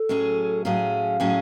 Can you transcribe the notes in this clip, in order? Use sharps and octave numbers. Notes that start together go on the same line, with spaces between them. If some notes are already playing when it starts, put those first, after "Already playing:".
Already playing: A4
A2 F#3 C#4 G#4
A2 F#3 C#4 G#4 F5
A2 F#3 C#4 G#4